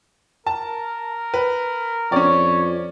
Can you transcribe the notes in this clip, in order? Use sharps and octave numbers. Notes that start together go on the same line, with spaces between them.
A#4 A5
B4
F2 C#4 C#5 D5